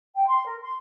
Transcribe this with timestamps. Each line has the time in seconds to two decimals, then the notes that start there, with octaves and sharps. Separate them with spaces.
0.15 G5
0.28 C6
0.46 A#4
0.62 C6